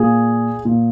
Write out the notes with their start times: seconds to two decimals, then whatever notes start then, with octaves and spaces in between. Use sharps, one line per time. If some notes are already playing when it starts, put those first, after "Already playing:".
Already playing: A#2 G#4
0.65 A#2